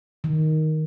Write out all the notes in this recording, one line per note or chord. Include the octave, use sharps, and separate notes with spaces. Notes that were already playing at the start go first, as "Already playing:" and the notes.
D#3